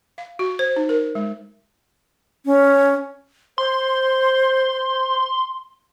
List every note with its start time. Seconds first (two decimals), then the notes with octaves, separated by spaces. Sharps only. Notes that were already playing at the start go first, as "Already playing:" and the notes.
0.18 F5
0.39 F#4
0.59 C5
0.76 D#4
0.89 A#4
1.15 G#3
2.46 C#4
3.58 C5 C6